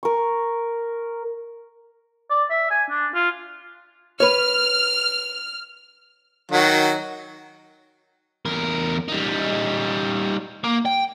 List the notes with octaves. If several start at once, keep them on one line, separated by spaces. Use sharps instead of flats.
A#4 C#6
D5
E5
G#5
D4
F4
B4 C#5 F6
D#3 F#3 F#4
E2 A#4
G3 D#4
A#3
G5